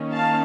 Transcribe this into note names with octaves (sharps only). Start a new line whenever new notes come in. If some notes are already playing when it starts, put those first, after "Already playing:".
Already playing: D#3 A#3 C#4
F5 A5